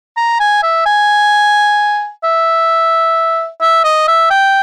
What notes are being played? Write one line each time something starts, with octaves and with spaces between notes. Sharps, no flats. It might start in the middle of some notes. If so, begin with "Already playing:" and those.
A#5
G#5
E5
G#5
E5
E5
D#5
E5
G5